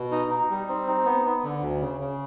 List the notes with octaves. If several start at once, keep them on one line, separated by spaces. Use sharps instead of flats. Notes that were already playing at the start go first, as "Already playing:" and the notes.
Already playing: B2
D#4
D#4
G3
C4
D#4
B3
B3
D3
D2
C#3
C#3